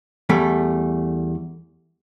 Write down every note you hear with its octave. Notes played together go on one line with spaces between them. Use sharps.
E2 G3 A3